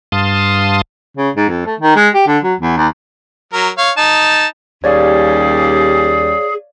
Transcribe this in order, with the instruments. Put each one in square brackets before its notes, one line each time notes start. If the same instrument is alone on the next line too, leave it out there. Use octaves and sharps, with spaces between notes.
[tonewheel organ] G2 F5 A5 C6 D#6
[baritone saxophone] C#3
G#2
F2
A3
D#3
G#3
G4
D3
F#3
E2
D#2
[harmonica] F#3 A#4
C#5 F5
D#4 A5
[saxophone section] D#2 G3 C#4 [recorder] G#4 [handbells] C#5 D5 F5